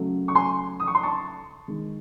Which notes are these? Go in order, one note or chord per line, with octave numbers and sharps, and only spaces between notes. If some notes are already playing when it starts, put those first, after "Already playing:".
Already playing: C#3 F#3 A3
C#6
G#5 C6
D#6
C#6
C6
A5 C#6
D#3 G#3